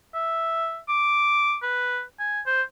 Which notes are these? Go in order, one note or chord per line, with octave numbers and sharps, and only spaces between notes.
E5
D6
B4
G#5
C5